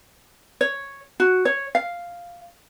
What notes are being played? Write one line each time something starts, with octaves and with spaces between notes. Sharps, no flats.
C#5
F#4
C#5
F5